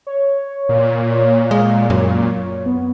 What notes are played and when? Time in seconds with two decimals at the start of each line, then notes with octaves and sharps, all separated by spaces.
0.07 C#5
0.69 A#2
1.51 G#3 F5
1.90 F#2 C#5
2.66 B3